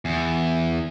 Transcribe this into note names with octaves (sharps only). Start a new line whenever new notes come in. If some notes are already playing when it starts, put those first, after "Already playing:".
E2